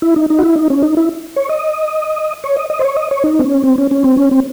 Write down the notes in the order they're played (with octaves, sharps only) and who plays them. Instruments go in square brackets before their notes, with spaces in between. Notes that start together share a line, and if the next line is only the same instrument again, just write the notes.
[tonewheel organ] E4
D#4
D#4
F#4
E4
D#4
C#4
D#4
E4
C#5
D#5
C#5
D#5
D#5
C5
C#5
D#5
C#5
D#4
C4
C#4
C4
C#4
C#4
C4
C#4
C4